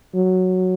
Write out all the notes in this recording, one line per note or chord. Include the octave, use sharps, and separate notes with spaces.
F#3